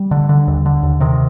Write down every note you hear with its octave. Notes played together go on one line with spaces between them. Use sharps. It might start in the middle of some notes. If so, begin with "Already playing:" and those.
Already playing: G3
D3
D3
D#2
D3
D#2
C3 D#3